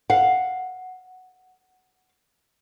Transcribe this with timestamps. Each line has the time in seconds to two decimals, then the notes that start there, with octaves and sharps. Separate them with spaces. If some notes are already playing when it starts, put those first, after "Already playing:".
0.10 F5 F#5